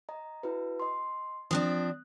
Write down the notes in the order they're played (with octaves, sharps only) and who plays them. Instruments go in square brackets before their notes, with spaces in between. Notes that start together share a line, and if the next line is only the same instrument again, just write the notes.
[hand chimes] D#5 A#5
E4 F#4 B4
D#5 C6
[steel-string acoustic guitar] F3 C4 D4 [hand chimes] D#6 F#6